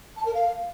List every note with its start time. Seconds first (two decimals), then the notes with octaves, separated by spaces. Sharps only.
0.17 A5
0.25 A#4
0.34 F5